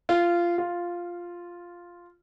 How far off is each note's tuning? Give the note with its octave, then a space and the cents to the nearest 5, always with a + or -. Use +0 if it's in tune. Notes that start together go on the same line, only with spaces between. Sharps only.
F4 -15
F4 +0